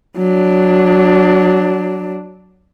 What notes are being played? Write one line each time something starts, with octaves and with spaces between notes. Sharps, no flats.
F#3 D4